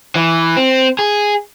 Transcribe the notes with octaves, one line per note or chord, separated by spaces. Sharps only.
E3
C4
G#4